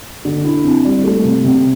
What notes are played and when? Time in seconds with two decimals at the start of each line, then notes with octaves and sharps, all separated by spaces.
0.25 D3
0.45 E4
0.64 C4
0.84 G3
1.04 A3
1.24 C3
1.44 C3